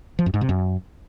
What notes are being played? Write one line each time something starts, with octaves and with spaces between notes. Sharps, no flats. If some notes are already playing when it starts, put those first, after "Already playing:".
F3
F#2
G#2
C3
F#2